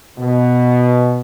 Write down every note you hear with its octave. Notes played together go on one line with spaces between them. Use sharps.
B2